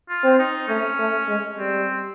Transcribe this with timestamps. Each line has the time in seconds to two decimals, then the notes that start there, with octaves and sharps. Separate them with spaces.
0.09 F4
0.24 C4
0.39 D#4
0.68 A3 C#4
0.99 A3
1.28 G#3
1.58 G3 C4